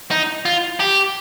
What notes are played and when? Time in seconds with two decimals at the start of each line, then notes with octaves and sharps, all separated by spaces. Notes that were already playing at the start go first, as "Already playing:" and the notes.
0.11 D#4
0.45 F4
0.80 G4